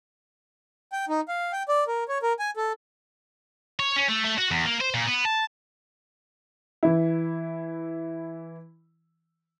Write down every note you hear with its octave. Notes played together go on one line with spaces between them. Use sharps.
G5
D#4
F5
G5
D5
A#4
C#5
A#4
G#5
A4
C#5
C#4
A3
A3
F#4
E2
A#3
C5
A#2
B3
A5
E3 E4